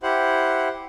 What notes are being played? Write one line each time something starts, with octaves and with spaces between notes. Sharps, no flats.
E4 G4 C5 F#5